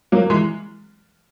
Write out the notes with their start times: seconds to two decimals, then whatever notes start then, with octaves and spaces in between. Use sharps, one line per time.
0.12 F#3 A#3
0.30 E3 G#3